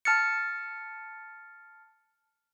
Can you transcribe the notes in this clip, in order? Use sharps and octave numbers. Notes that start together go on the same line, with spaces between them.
A5 F6 A6 C#7